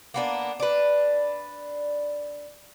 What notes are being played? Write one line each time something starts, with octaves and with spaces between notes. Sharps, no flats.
A#3 B3 D4
D4 B4